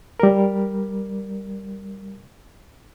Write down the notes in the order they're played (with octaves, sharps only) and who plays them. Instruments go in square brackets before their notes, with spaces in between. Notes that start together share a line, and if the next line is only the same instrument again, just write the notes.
[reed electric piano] G3 A#4